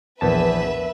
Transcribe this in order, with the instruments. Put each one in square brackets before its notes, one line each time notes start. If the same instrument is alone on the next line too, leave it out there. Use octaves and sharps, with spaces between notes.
[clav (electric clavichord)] A#1 E2 A5 [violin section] B4 E5